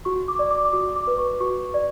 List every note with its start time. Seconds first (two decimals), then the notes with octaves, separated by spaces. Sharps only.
0.05 F#4 C#6
0.28 D6
0.39 D5
0.51 D6
0.65 D6
0.73 F#4 D#6
0.96 D6
1.07 B4
1.18 C#6
1.40 F#4 C#6
1.74 D5